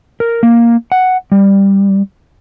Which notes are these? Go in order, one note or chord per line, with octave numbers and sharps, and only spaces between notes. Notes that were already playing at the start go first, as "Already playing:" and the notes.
A#4
A#3
F#5
G3